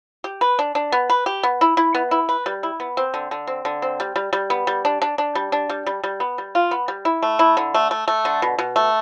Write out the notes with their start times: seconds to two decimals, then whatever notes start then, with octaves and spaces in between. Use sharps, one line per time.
0.24 G4
0.41 B4
0.59 D4
0.75 D4
0.92 B3
1.10 B4
1.26 G4
1.43 B3
1.61 E4
1.77 E4
1.95 B3
2.11 E4
2.29 B4
2.46 G3
2.63 E4
2.80 B3
2.97 C4
3.14 D3
3.31 D3
3.47 C4
3.65 D3
3.82 C4
4.00 G3
4.16 G3
4.33 G3
4.50 B3
4.67 G3
4.85 D4
5.02 D4
5.18 D4
5.35 G3
5.52 D4
5.70 G3
5.86 G3
6.03 G3
6.20 B3
6.38 G3
6.55 F4
6.71 B3
6.88 G3
7.05 E4
7.23 A3
7.39 E4
7.57 D3
7.74 A3
7.91 A3
8.08 A3
8.25 D3
8.42 B2
8.59 B2
8.76 A3